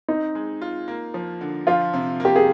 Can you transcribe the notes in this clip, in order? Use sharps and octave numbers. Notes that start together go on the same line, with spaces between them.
C4 D#4
G#3
F4
A#3
F3
D3
F3 F4
C3
A#3 G4
G#4